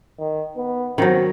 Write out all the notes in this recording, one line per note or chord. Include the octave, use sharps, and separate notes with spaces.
D#3
B3
D#3 F#3 C4